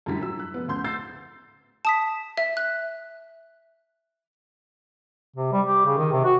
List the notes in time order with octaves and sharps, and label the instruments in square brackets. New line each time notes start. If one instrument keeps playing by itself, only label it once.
[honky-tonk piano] F#2 A2 D3 G3 B6
F#3 E6
F#6
F1 B3
D2 C#4 C6 G6
E6 G6 A6 C7
[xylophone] A5 D#6 B6
E5
F#6
[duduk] C3
G3
G4
C#3
D#3
C3
F#4